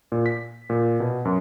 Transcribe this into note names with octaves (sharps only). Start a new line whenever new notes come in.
A#2
B6
A#2
B2
F#2